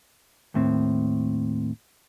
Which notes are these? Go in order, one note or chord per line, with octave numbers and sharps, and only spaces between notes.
D#2 A2 C4